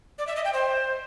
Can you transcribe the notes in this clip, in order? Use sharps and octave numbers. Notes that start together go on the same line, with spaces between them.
D5
E5
D#5
G5
C5